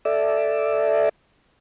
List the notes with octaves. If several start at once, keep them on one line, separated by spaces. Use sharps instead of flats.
A4 D5 E5